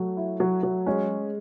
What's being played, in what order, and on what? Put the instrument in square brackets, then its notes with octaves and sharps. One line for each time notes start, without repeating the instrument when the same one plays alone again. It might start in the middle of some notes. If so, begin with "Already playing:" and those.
Already playing: [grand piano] F#3 [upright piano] A3
[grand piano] E4
F#3
F#3
[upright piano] G#3 [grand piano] C#4